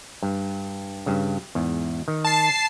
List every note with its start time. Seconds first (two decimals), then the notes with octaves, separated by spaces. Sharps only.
0.23 G2
1.06 G2 C#3
1.55 E2 G#2
2.08 D#3
2.25 A5 C7